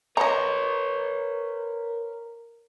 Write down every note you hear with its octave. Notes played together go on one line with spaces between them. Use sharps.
A#4 B4 C#5 D#5 A#5